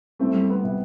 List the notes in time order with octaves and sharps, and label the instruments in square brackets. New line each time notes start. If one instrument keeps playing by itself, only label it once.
[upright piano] C2 [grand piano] A3 C4
[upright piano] G3
B3
C3